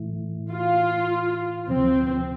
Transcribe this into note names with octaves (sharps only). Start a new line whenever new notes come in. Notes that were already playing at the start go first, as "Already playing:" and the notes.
Already playing: A2 E3 A3 E4
F4
D2 C3 F3 C4